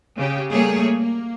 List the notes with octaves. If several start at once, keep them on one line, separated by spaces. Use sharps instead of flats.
C#3 G4
G3 A3 A#3 G#4 C#5
A#3